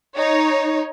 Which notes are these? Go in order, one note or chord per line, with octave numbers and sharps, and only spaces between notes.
D#4 C#5